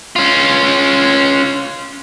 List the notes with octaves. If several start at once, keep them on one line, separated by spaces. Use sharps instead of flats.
C#4 F4